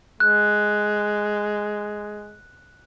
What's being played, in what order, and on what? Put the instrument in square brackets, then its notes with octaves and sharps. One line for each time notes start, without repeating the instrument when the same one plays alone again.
[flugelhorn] G#3 [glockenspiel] F#6